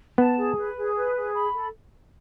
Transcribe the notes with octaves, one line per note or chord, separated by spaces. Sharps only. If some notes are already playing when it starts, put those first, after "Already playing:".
B3 A5
G#4
B4
G#4
B4
G#4
B5
A4